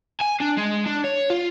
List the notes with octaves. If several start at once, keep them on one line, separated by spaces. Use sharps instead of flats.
G#5
D4
G#3
D4
C#5
F4